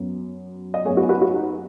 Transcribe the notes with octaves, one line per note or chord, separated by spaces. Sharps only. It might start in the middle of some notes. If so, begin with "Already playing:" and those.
Already playing: F#2 F#3 B3
D#5
F#2 F#3 B3 G#4 C#5
F#4 B4
F#4 B4
F#4
D#4